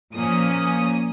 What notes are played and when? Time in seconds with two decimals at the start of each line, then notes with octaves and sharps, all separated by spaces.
0.13 A#2 F3 A#3 C#4 D#6